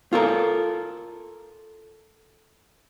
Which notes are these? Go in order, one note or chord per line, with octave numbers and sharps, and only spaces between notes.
F4 A4 A#4